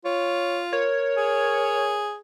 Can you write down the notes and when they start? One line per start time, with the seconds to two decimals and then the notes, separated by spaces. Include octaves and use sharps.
0.05 F4 C#5
0.73 A#4 C#5
1.17 G#4